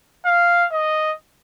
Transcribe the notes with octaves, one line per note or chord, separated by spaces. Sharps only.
F5
D#5